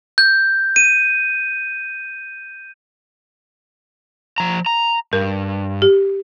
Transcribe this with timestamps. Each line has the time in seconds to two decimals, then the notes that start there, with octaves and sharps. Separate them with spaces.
0.18 G6
0.76 D#7
4.38 F3 A#5
4.66 A#5
5.13 G2 A#4
5.82 G4